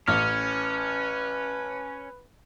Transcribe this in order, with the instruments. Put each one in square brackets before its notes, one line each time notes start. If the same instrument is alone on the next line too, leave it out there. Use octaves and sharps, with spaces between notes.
[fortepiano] A1 [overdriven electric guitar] C#4 [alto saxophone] B4 [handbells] F6